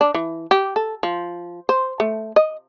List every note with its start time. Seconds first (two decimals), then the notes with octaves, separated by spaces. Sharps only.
0.01 D4
0.14 E3
0.51 G4
0.76 A4
1.03 F3
1.69 C5
2.00 A3
2.36 D#5